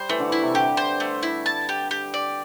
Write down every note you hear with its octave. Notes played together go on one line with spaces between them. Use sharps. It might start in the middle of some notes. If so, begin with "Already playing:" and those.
Already playing: G3 C5
E3 A3
D3
E3 E4
C3
D3 G4
C5
A3
E4
A5
G4
G4
D5